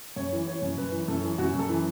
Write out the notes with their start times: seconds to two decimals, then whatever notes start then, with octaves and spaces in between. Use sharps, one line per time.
0.16 F#2 C#5
0.33 E3
0.47 E3 C#5
0.62 F#2
0.77 F#2 B4
0.92 E3
1.08 F#2 A4
1.23 E3
1.38 F#2 F#4
1.54 F#2 A4
1.69 E3